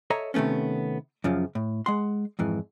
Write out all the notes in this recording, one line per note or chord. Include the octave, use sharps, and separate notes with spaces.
A4 C#5 D#5 E5 A#5
C3 D#3 A3 B3 C#4
F#2 C#3 F3
A2
G#3 F#5 C6
F2 G#2 E3